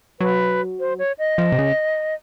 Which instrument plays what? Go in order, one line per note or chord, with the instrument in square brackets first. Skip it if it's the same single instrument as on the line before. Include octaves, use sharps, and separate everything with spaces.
[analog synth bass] F#3 [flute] B4
[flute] C5
C#5
D#5
[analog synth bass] F3
C3
C#3